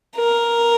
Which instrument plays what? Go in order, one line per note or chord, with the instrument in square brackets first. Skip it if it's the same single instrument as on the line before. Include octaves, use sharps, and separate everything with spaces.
[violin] A#4